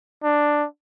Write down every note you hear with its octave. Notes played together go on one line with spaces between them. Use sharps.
D4